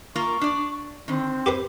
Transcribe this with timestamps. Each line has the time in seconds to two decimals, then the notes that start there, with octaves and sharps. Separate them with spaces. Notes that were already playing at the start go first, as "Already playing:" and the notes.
0.15 A#3 F4 A#4 C#6
0.41 D4 D5
1.08 D3 D#3 C4
1.46 G4 B4 C5